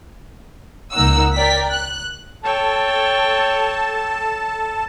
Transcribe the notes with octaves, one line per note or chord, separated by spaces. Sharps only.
C#2 A#3 D#4 A#4 F#5 E6
A#4 D5 G5 B6
F#6
A4 C#5 G5 A5